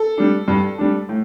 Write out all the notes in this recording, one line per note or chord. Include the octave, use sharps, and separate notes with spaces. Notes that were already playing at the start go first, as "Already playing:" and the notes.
Already playing: A4
G3 D4
G2
G3 D4
A2